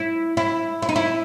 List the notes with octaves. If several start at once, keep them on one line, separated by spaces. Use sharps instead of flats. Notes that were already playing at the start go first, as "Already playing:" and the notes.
Already playing: E4
E4
E4
D#4
E4